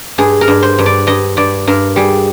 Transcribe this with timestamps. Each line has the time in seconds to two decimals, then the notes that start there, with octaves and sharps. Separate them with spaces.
0.18 G2 G#4
0.41 A#4
0.48 G2
0.63 C5
0.78 G2
0.86 D5
1.07 G2 D#5
1.37 G2 D5
1.67 G2 A#4
1.96 G3 G#4